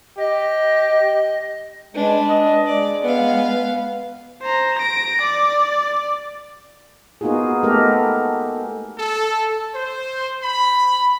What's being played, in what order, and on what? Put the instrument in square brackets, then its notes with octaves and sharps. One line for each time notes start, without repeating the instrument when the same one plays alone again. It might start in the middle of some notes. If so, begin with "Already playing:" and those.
[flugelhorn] G4 [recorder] D#5
[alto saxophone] G#3 [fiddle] D4 B4
[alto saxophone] D#5
[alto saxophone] G#3 [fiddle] D5
[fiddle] B3 F5
[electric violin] C5 A#5
A#6 D7
D5
[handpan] A#3 B3 D#4 F4 F#4 G#4
G#3 A3 B3 G4 A4 A#4
[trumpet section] A4
C5
B5